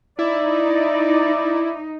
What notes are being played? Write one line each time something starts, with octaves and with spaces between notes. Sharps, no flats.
D#4 E4 D5